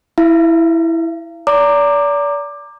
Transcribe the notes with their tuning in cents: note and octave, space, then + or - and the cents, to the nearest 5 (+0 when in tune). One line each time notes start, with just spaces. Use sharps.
E4 +0 F5 -45
D5 -35 A#5 -10 D6 +15